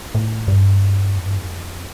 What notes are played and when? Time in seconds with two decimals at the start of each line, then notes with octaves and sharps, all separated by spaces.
0.15 A2
0.48 G2
1.17 F2
1.26 G2
1.37 F2